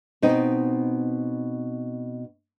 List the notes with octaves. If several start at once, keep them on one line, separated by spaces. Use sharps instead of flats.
B2 C4 D#4